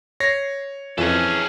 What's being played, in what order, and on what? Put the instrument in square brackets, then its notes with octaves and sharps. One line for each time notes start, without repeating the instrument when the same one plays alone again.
[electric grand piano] C#5 A#6 [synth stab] C7
[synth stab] F2 [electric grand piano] E3 [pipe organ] C#4 [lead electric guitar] G#4 A4